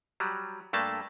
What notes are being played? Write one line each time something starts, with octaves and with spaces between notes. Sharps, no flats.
F#3 G3
G2 A3 A#3 A5